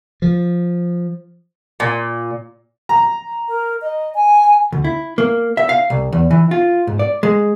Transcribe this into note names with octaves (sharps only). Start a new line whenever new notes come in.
F3
A#2
A#5
A#4
D#5
G#5
D2
E4
A#3
E5
F5
C2
E2
E3
F4
G#2
D5
G#3